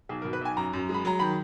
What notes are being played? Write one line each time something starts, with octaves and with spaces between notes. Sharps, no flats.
B1 G#4
A#4
B2
B4
B1 G#5
F#2 A#5
F#2
G#3
B5
F#3 A#5
D#3 B5